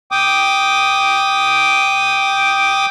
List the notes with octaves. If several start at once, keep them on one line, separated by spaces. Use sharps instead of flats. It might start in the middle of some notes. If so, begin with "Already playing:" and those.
G5 D6 D#6